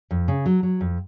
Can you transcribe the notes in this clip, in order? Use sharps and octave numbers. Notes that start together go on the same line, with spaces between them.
F2
C#3
F#3
F#3
F2